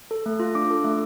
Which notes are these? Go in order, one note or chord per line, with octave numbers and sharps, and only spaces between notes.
A4
A3
F4
D4 D6
A4
A3